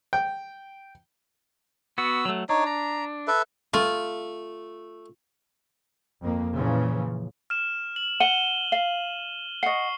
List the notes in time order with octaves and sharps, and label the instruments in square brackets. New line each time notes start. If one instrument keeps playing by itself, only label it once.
[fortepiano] G5
[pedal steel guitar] B3 F#4 [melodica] E6
[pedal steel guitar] F#3 A3
[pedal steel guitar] D4 [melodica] D#4 C#5
[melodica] A#5
A4 B4 E5
[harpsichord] A3 [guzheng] F4
[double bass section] F2 A#3
A#2 C#3 E3 F3
[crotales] F6 E7
F#7
[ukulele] F#5 [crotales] D#7 G7
[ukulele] F5
[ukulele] D#5 F#5 [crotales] C#6 C7